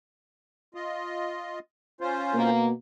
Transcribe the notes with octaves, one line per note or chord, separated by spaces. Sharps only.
F4 D#5
C#4 F4 C5
B2 A#3